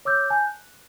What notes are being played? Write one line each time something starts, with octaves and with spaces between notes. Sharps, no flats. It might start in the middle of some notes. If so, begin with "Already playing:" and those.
C#5 D6 E6 G6
G#5 A5 G6
F#6